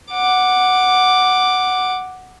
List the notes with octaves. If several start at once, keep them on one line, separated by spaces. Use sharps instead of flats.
F#5 D6